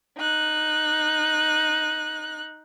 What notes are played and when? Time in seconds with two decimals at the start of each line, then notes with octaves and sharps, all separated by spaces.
0.18 D#4 F#6